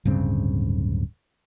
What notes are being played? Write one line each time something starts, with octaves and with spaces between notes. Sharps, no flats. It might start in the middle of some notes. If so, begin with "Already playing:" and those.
D1 G2 C#3 C4